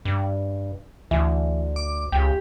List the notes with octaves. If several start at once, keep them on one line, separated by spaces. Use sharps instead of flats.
G2
D2 E3
D6
C#2 G4